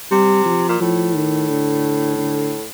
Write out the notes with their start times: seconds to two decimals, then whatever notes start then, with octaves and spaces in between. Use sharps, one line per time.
0.11 C3 G3
0.46 F3
0.69 A#2
0.80 A2 F3
1.15 D#3
1.49 D3
2.18 D3